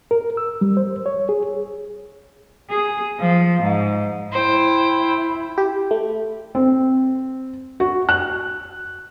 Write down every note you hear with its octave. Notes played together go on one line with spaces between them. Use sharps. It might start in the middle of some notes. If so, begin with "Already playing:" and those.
A#4
E6
G3
C5
C#5
G#4
G#4
F3
G#2
E4 C5 G5
G4
A3
C4
F#4
F#6